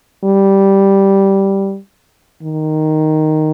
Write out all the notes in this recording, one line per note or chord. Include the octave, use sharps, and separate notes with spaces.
G3
D#3